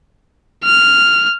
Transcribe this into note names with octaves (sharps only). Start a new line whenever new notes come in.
F6